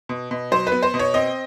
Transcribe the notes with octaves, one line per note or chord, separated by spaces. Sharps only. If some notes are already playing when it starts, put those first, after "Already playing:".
B2
B2
F#3 C5
B4
B3
C5
B2
C#5
C4 D#5